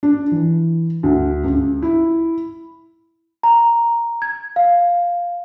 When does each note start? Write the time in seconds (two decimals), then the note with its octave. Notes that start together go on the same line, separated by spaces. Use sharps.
0.03 D4
0.32 E3
1.03 D2
1.44 C#2
1.82 E4
3.43 A#5
4.22 G#6
4.56 F5